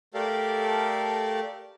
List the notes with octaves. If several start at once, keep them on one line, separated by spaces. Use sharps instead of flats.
A3 G4 A4 A#4 D5 F5